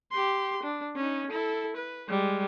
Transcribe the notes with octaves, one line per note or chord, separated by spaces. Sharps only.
G4 C6
D4
C#4 D#4
E4 A4
B4
G3 G#3